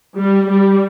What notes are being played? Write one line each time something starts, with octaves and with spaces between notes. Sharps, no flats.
G3
G3